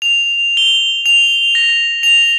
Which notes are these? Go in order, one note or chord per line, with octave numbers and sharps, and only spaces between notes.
F7
G7
F7
A#6
F7